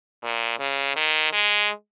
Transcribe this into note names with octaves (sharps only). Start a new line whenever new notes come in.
A#2
C#3
D#3
G#3